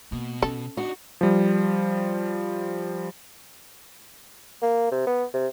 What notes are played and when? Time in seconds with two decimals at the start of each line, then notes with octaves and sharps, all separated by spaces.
0.12 B2 A#3
0.42 C#4 A4
0.77 D4 D#4 F#4
1.21 F3 G3
4.62 A#3
4.92 C3
5.07 B3
5.34 C3